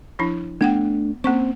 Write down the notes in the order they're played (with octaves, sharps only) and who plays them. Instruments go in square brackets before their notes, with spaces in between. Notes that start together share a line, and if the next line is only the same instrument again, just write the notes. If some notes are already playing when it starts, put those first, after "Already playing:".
[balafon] F3 D4 E4
[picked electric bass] A3 D4 [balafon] B3 F#5 G5
[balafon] A#3 C#4 C#6 [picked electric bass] C4